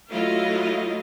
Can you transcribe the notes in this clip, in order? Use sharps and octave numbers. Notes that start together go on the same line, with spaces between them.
F#3 A3 E4 F4 D#5 F5